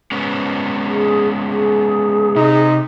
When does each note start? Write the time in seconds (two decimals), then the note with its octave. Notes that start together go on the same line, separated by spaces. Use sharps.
0.12 G#3 B3 C#4
0.89 G#4
1.47 G#4
2.36 C3 D#4